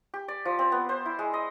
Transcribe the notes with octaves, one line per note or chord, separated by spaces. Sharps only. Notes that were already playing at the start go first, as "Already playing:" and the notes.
G4
D5
F3
C4
B3
C5
E4
G#3
D#5